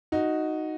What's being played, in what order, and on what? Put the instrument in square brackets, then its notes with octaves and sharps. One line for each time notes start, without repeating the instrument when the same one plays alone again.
[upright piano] D#4 F#4